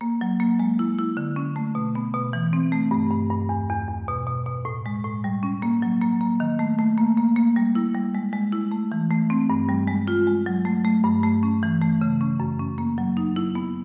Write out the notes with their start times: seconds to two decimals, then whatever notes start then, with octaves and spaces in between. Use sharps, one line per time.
0.01 A#3
0.21 F#3
0.40 A#3
0.59 G#3
0.79 E4
0.99 E4
1.17 D3
1.36 C#4
1.56 A3
1.75 B2
1.95 B3
2.14 B2
2.33 E3
2.53 C4
2.72 A3
2.91 G2
3.11 G2
3.30 G2
3.49 E2
3.69 E2
3.88 E2
4.08 B2
4.27 B2
4.47 B2
4.65 A2
4.86 G#3
5.04 A2
5.24 G3
5.43 C#4
5.62 A#3
5.82 F#3
6.01 A#3
6.21 A#3
6.40 D#3
6.59 A3
6.79 A3
6.98 A#3
7.17 A#3
7.36 A#3
7.56 G3
7.75 E4
7.95 G3
8.15 G#3
8.33 G#3
8.53 E4
8.72 A3
8.92 E3
9.11 A3
9.30 C4
9.50 G2
9.69 G3
9.87 G#3
10.08 F4
10.27 G#3
10.46 F#3
10.65 A3
10.85 A3
11.04 G2
11.23 A3
11.43 C#4
11.63 E3
11.81 A3
12.02 C#3
12.21 C#4
12.40 F#2
12.59 C#4
12.78 A#3
12.98 F#3
13.17 D#4
13.36 E4
13.55 B3